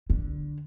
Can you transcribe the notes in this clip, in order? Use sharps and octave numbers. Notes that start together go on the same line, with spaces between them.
D3